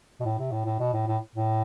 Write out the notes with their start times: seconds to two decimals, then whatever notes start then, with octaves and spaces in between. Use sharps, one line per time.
0.21 B2
0.25 A2
0.39 C3
0.52 A2
0.66 A2
0.80 B2
0.94 A2
1.08 A2
1.35 A2